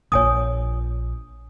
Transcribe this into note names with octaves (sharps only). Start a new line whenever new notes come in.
A#1 F4 C#5 G#5 D#6